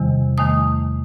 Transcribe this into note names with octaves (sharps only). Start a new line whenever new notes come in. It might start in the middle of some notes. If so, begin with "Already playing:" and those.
Already playing: E2 C3 D#3 G3
E2 D#3 A3 D#6